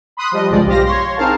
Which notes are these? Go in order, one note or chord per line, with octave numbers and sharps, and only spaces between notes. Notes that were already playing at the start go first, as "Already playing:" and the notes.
B5 C6 D#6 F#6
F3 G3 D#5
G#1 C#2 G2 F3 G#3 D5
B1 G4 C5 F5 A#6
C#5 C6
C4 D#4 G#4 A#4 F5 A5